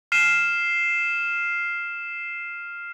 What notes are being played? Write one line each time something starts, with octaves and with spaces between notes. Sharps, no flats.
F6 C7 D#7 E7